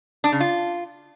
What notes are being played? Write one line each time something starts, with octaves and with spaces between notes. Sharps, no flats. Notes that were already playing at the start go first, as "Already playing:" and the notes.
D4
C#3
F4